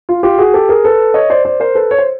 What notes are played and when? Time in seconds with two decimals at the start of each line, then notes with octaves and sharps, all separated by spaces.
0.09 F4
0.23 F4 G4
0.38 F#4 G#4
0.54 G4 A4
0.69 G#4 A#4
0.84 A4 B4
1.14 C#5 D#5
1.30 C5 D5
1.45 C5 D5
1.60 A#4 C5
1.75 A4 B4
1.91 C#5
1.98 C5